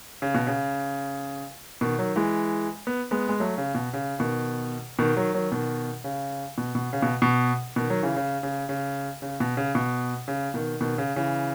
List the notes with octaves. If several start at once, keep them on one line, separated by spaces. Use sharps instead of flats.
C#3
B2
C#3
B2 D#3
D#3 F#3
E3 G#3
B3
G#3 B3
G#3
F#3 A3
C#3
B2
C#3
B2 D#3
B2 D#3
D#3 F#3
D#3 F#3
B2 D#3
C#3
B2
B2
C#3
B2
B2
B2 D#3
D#3 F#3
C#3 E3
C#3
C#3
C#3
C#3
B2
C#3
B2
C#3
B2 D#3
B2 D#3
C#3
C#3 E3